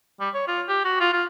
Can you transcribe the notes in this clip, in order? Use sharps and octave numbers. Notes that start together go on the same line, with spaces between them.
G3
C#5
F4
G4
F#4
F4
F4